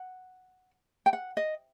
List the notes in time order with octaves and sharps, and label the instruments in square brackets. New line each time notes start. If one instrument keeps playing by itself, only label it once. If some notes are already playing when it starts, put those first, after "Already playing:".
Already playing: [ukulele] F#5
G5
F#5
D#5